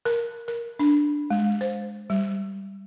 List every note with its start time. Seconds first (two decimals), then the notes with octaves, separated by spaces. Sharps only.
0.05 A#4
0.48 A#4
0.79 D4
1.30 G#3
1.61 C5
2.10 G3